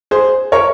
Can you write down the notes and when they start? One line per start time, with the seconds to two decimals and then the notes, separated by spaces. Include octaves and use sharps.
0.11 G#4 C5
0.52 A#4 C#5